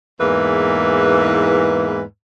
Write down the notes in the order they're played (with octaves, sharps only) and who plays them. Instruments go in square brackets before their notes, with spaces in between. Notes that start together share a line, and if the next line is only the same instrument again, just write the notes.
[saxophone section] E2 G#2 E3 A#3 B4